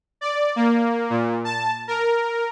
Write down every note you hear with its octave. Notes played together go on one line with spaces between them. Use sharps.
D5
A#3
A#2
A5
A#4